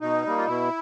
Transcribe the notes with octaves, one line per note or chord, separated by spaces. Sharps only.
B2 D#4
G3 A#3
F4
B2 E4